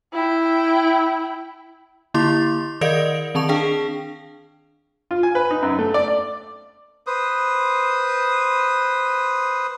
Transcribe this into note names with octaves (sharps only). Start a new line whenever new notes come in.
E4 G5
D3 A#3 E4 C6 D6 A6
D#3 A#4 D5 D#5 F5 D7
D#3 C4 A5 C#6 F7
D4 G#4 F5 G5 A5
F4
G#5
B4
D#4
F#2
A3
D5
D5
B4 C5 D#6